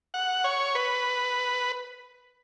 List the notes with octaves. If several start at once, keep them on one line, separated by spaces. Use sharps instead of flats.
F#5
C#5
B4